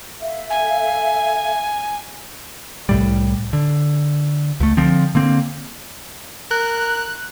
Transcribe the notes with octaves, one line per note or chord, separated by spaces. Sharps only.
A4 E5 F5
G#5
C2 A2 G3
D3
C#2 A3
D3 F3 C4
D3 A#3 C4
A#4 F#6